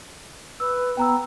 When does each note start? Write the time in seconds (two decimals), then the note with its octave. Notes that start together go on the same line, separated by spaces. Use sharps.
0.60 B4 E6
0.97 B3 G5 A#5 E6